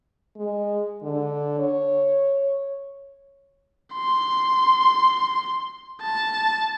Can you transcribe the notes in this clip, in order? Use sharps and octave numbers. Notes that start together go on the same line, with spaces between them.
G#3
D3
C#5
C6
A5